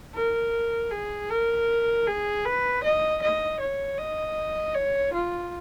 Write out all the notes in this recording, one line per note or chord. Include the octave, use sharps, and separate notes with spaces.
A#4
G#4
A#4
G#4
B4
D#5
D#5
C#5
D#5
C#5
F4